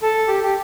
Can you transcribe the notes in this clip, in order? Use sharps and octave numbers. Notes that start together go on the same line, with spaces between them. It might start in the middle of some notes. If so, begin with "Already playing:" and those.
A4
G4
G4